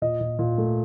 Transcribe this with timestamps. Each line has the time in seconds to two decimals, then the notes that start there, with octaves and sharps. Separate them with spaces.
0.02 A#2 D#5
0.20 A#2
0.39 A#2
0.58 A3